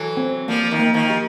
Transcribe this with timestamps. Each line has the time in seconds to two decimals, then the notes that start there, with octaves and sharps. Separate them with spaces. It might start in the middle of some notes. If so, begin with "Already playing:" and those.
Already playing: E3 F#3 A4
0.17 C4
0.48 F3 G3 A#3
0.71 D#3 F3
0.79 A#3
0.94 D#3 F3
1.10 G4